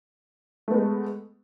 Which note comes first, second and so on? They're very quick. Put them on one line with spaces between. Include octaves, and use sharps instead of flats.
A3 B3 G#3